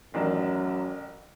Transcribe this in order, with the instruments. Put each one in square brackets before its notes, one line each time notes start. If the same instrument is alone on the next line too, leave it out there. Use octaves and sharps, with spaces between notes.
[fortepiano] A1 D#3 D4 [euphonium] F#2